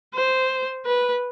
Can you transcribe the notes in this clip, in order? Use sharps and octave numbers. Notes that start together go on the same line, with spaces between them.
C5
B4